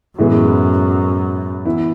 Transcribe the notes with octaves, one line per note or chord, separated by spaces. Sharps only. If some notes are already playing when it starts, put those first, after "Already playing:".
F#2 A2 E3 G#3 B3
E3 B3 E4